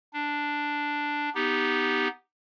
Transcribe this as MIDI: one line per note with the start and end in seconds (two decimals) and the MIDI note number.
0.13 1.29 62
1.35 2.08 59
1.35 2.08 63
1.35 2.08 67